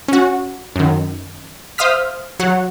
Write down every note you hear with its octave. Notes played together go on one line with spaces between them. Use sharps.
C#4 F#4
F#2 D#3
C5 E5 F5 D#6 F6 B6
F#3 F#5